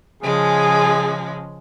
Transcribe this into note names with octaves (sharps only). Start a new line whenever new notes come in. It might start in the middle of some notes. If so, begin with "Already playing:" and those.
C#3 F3 G#3 G#4